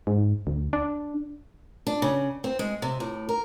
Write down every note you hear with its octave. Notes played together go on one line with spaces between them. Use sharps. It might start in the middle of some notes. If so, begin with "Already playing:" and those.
G#2
D2
D4
D4
C#3
C4
G#3
C3
A2
A#4